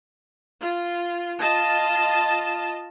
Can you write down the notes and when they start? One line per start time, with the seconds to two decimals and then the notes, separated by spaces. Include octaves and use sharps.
0.62 F4
1.38 F4 D#5 A5